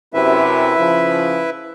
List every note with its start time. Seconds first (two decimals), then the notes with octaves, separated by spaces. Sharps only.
0.14 F#2 C3 E4 B4 E5
0.78 C#3 F3